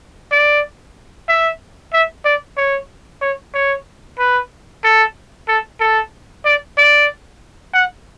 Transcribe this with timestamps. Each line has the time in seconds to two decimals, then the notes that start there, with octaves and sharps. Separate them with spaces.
0.32 D5
1.28 E5
1.93 E5
2.25 D5
2.57 C#5
3.22 C#5
3.54 C#5
4.19 B4
4.84 A4
5.48 A4
5.80 A4
6.45 D5
6.78 D5
7.73 F#5